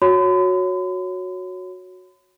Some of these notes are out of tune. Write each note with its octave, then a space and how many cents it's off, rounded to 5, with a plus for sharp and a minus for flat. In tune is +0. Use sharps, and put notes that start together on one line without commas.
F#4 -10 C#5 +0 B5 +45